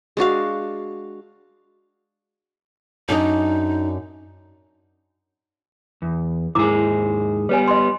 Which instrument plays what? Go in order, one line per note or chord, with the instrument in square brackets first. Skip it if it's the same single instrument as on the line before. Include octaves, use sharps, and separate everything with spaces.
[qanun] G#3 D4 F#4 F5
[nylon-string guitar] F#2 D4 D#5 [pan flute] D#4
[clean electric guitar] E2
[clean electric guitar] D#2 G#2 G#4 [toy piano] E4 A#4 D6
[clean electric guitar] G3 B3 [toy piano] B4 C#5 G#5
[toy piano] D#5 C6